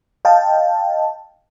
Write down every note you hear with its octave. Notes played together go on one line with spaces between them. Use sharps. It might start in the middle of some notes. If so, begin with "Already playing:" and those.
D#5 F5 G5 A5